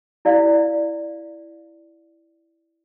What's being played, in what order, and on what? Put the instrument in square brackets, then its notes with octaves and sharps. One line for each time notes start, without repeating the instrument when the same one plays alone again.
[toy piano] E4 D5 F5